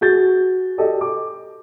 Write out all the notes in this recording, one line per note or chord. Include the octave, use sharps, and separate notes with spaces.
F#4 G#4 G6 A6
F#4 G4 A4 D5 D#5
D6